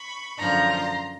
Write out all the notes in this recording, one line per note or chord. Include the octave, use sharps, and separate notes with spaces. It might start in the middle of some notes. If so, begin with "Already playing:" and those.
Already playing: B5 C#6
F#2 D3 F3 A#5 C6